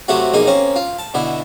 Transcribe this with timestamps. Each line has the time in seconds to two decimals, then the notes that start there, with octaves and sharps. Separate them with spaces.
0.08 C3 F#3 A3 C4 F#4
0.33 B1 F2 A#3 D#4 G#4
0.47 A#3 C4 C#4
0.76 F4
0.99 A5
1.14 B2 D3 E4